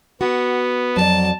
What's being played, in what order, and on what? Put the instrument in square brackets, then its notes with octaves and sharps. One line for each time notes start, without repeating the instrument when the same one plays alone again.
[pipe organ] B3 [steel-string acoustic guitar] F#4
[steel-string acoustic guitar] F2 G4 D5 [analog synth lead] F#3 [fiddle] A5